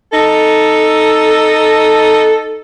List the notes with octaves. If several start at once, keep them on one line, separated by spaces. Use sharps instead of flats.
D#4 A4